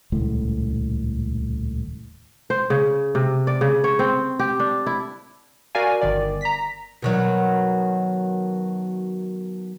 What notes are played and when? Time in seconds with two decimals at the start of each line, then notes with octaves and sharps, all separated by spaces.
0.12 D#1 C#2 A2
2.50 C5
2.70 C#3
3.15 C3
3.47 D5
3.61 C#3
3.84 C#5
3.99 C4
4.39 G4
4.60 D4
4.87 E4
5.75 F#4 A#4 D5 F5 G#5
6.01 G1 D#3 D5
6.41 A#5 B6
7.02 B2 D#3 F#3